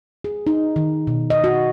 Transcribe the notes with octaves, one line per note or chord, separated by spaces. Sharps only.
G#4
D#4
D#3
B2
D#5
F#4